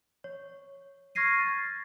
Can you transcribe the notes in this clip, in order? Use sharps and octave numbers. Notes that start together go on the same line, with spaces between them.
C#5
C#6 F6 G#6 A#6 C7 D#7
A6